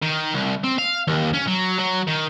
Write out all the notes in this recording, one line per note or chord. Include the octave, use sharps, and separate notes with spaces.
D#3
C2
C4
F5
D#2
C#4
F#3
F#3
D#3